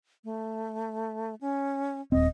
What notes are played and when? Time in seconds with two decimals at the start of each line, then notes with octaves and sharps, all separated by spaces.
0.24 A3
1.41 C#4
2.12 D#1 C4 D#5